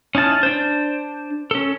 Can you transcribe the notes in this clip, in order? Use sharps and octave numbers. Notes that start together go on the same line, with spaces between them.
C#4 D#4 E4 A5 F6
D4 C5
C#4 A4